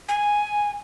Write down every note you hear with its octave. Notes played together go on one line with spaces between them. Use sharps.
G#5